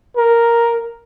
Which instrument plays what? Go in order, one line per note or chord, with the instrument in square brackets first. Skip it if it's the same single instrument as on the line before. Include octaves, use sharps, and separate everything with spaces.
[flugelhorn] A#4